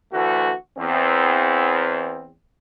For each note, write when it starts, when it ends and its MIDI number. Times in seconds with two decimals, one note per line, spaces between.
0.13 0.53 38
0.13 0.53 52
0.13 0.53 57
0.13 0.53 66
0.78 2.31 40
0.78 2.31 60